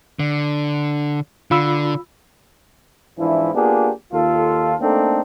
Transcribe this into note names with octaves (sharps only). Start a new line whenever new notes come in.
D3
D3 F4 B5 E6
G#2 E3 F3 D4 E4
A#3 B3 D4 F4 G4 G#4
D#2 F4 A4
A3 A#3 C4 D4 D#4 A4